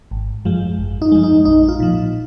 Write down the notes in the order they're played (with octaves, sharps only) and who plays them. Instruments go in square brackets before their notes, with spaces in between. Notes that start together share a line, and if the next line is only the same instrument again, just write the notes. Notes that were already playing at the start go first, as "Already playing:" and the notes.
[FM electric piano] G#1
F#2 F3 G#3
G#1
D#4
F#2 F3 G#3
D#4
A#1 D#4
F4
A#2 F3